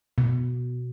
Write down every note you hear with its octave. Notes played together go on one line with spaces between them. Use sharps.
B2